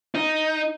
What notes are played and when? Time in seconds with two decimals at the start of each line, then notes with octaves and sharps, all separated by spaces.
0.15 D#4